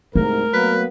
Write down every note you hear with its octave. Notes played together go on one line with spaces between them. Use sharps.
C2 G#2 A3 A#4
F#3 A#3 B3 B4